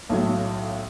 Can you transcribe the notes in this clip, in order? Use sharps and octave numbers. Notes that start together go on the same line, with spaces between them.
B1 A2 F#3